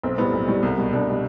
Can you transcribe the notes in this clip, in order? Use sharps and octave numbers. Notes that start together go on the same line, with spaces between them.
B1 C4
A2 G3 B3
B1
A2 G3
C2
B2 G3
C2 D4
B2 G3